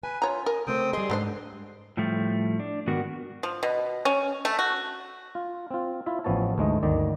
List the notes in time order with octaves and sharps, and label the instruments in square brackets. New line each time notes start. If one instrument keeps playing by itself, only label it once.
[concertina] B4 [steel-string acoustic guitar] G#5
[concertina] F4 [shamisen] C#5 A#5
[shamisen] A#4 [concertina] D#6
[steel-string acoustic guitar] C#3 A3 C5 [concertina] C4 G5 D#6
[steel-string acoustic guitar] G3 G#4 [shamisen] D#5 [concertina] C6
[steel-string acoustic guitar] G#2 [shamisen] A3 D4 C5
[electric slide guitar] A2 F3 G3 A3
D4
G#2 D#3 B3 F#4 A#4
[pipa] F3
B2
C#4
A3
F#4
[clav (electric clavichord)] F4
C4 F4
E4 F4 E5
A1 F3 B3 C#5 A5
D2 G#2 G#3 A3 D#5
G1 D2 D#3 D5 D#5